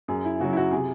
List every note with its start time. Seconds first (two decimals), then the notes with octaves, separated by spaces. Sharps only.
0.08 F#2 G#4
0.25 E4
0.40 C#3 F#3 F#4
0.52 E4
0.57 F#4
0.72 C3 G#4